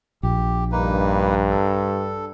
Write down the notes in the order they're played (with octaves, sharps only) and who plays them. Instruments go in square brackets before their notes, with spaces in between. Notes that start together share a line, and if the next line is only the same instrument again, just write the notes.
[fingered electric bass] A#1 [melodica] G4
[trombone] G2 [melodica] A#3 D#4 B4
[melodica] A4